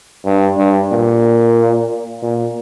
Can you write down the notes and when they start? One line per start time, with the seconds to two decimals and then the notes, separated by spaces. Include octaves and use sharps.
0.25 G2
0.58 G2
0.92 A#2
2.22 A#2